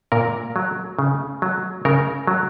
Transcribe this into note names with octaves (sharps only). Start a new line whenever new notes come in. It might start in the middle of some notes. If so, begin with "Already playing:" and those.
A#2 A#4
F#3
C#3
F#3
C#3 A#4
F#3